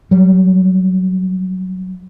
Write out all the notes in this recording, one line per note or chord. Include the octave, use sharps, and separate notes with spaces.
F#3 G3